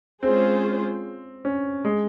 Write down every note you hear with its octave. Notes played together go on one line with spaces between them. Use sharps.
G#3 C4 C#4 F4 G#4 C5
C#4
G#3